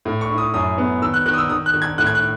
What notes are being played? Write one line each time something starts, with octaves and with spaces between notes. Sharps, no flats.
A2
C#6
E4
D#6
F#2 D#6
B3
D#3 E6
F#6
D#3 F#6
D#6
E6
D#3 D#6
F#6
D#3
G#6
A2 F#6
G#6
F#6